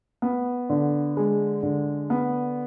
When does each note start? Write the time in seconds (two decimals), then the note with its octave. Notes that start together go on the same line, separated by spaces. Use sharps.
0.22 B3
0.70 D3
1.17 G#3
1.63 D3
2.10 B3